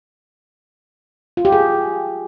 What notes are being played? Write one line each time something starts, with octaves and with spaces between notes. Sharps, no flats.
F4
G4
G#4